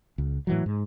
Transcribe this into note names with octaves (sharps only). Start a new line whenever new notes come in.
C#2
A2 E3 F#3
G#2